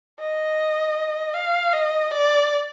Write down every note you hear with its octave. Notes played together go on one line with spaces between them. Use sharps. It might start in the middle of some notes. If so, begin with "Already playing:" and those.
D#5
F5
D#5
D5